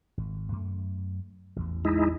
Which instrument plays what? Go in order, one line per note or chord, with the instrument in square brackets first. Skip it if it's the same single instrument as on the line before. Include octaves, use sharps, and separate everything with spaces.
[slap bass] G#1
F#2 A3
A1 E2
[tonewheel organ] G#3 D#4 E4